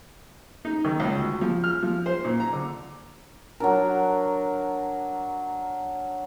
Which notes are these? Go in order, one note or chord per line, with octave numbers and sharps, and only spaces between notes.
D#4
D#3
C#2
D2
F3
F6
F3
C5
A#2
A#5
D3
F#3 D4 A#4